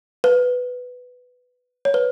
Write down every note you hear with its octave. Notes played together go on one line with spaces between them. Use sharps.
B4
C#5
B4